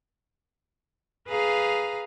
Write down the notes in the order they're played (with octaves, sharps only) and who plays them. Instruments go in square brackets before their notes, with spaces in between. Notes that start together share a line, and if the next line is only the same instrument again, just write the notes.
[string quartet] G#4 B4 F5 A#5